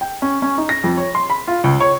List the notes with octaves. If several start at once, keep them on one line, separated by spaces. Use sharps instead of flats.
G5
C#4
C#4
D#4
A#6
F2
C#5
C6
B5
F4
C#2
C#5